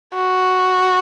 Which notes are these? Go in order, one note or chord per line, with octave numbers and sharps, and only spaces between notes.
F#4